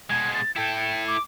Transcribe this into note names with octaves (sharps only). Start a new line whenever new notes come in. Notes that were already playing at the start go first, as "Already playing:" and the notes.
B2 G#3 G#6
A6
E4 A4 G5
D6